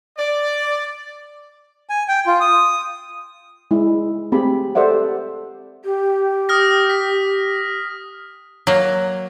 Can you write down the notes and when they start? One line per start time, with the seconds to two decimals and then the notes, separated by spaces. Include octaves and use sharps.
0.18 D5
1.89 G#5
2.08 G5
2.27 F4
2.40 D#6
3.71 G#3 E4
3.87 G#4
4.32 A3 C4 G4 G#4 B5
4.75 G4 A4 C5 D5 E5 F#5
5.85 G4
6.49 D#6 F6 A#6
6.90 A#6 B6
8.67 F#3 A#3